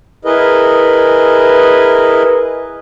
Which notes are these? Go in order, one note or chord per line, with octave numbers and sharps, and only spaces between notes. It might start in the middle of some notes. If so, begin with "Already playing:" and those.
E4 G#4 A#4 B4 D#5